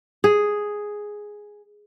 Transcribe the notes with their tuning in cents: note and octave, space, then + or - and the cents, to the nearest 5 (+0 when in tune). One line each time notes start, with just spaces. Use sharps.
G#4 +0